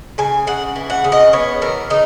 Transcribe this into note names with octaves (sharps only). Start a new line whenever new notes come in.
C#3 G#5
C#3 F#5
E3
F#5
C#3
D#5
B3 C#5
E3 A#4
C#3 D#4